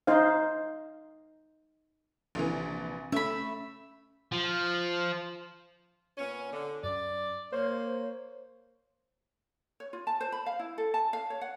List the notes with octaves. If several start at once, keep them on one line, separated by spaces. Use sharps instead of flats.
D#4 C5 F5
A#1 C3 E3
A3 C#4 E5 B5
F3
A#2 B3 C#4
D3
F#2 D5
A#3 C5 C#5
C#5
F4
A5
C5
B5
F5
E4
A4
A5
F5
C#5
F#5